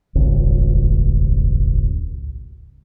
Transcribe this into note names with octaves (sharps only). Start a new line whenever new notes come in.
D#1 G#1 C#2